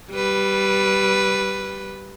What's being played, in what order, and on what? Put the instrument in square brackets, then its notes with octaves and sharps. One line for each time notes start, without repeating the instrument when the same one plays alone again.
[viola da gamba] G3 B4